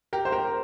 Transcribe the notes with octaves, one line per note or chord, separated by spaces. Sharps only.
G4 A#4
C5
G4 A#4